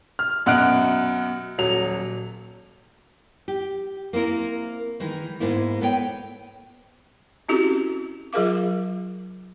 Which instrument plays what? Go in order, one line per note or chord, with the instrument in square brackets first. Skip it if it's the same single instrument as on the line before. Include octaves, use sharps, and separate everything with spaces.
[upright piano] F6
F#2 B2 F#5 F6 F#6 D7
D#1 F#3 F7
[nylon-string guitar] G4
A#3 C4 E4 A#4
D#3 E3 G#3 D#4
G#2 G#3 A#3 B3 E4
B3 A4 C#5 G5
[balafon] C4 C#4 E4 F#4 G4 A4
F#3 F4 G#4 A#4 F5 D6